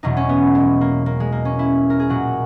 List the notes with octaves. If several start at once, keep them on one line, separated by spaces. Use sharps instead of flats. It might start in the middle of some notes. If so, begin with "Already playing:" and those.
E2 B2 F#3 D#4
C#4
B3
G#3
A#3
A#3
G#3
A#3
C#4
E4
A#4
G#4
A#2 F#3 F#4